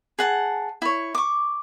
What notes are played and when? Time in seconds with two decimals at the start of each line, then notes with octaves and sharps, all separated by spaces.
0.19 G#4 F#5 A5
0.82 E4 C#5
1.15 C#6 D6